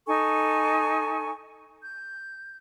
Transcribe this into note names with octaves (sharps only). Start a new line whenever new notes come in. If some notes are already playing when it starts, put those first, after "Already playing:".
D#4 A4 G#5 C#6
G6